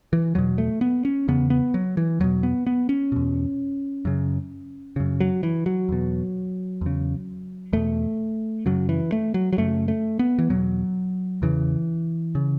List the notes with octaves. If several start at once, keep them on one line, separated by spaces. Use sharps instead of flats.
E3
E2 B2 F#3
A3
B3
C#4
E2 C#3 B3
B3
F#3
E3
E2 B2 F#3
B3
B3
C#4
E2 B2
F#2 C#3
F#2 C#3
F#3
E3
F#3
E2 B2
E2 C#3
E2 B2 A3
F#2 C#3 F#3
E3
A3
F#3
F#3
F#2 C#3 A3
A3
B3
E3
E2 B2 F#3
E2 C#3 E3
C#3